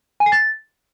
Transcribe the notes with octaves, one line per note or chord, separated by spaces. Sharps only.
G#5
C7
A6